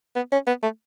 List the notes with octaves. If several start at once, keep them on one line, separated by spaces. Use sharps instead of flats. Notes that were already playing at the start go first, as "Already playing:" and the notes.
B3
C#4
B3
A3